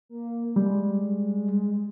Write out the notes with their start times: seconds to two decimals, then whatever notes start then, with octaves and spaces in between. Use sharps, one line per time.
0.09 A#3
0.56 G3 G#3